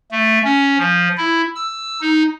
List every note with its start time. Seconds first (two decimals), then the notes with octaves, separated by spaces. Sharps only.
0.11 A3
0.44 C#4
0.78 F3
1.17 E4
1.55 E6
2.01 D#4